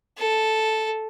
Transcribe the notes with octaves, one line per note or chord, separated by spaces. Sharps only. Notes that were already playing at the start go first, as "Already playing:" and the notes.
A4